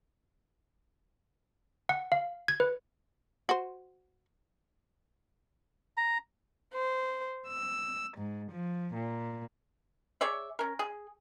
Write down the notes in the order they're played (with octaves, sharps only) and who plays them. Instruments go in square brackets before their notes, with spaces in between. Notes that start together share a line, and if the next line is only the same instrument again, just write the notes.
[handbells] F#5
F5
G#6
B4
[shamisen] F#4 C5
[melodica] A#5
[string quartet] C5
E6
G#2
F3
A#2
[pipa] G#4 C#5 D5 E5
C#4 A#4
G#4